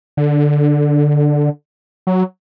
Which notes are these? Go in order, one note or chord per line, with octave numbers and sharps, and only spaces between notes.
D3
F#3